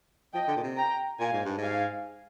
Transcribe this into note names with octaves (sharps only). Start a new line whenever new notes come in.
F3 D#5 G5
D3
A#2
C3
G5 A#5
A#2 F5 G#5
G#2
G2
G#2
F5 G#5